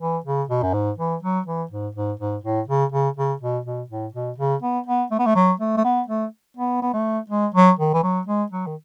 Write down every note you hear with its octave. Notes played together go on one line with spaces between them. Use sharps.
E3
C#3
B2
F#2
G#2
E3
F#3
E3
G#2
G#2
G#2
A2
C#3
C#3
C#3
B2
B2
A2
B2
C#3
B3
B3
A3
B3
A3
F#3
A3
A3
B3
A3
B3
B3
A3
G#3
F#3
D#3
E3
F#3
G#3
F#3
D#3